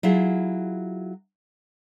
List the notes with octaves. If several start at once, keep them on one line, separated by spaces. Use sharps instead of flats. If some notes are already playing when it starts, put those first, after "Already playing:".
F#3 E4 F4 G#4